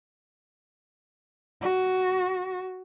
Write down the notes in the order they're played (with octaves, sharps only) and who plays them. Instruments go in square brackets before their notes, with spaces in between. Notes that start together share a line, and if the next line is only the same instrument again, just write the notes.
[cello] F#4